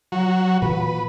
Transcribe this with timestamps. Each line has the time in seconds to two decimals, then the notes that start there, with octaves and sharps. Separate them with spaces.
0.12 F#3 F#4
0.62 A#2 E3 B4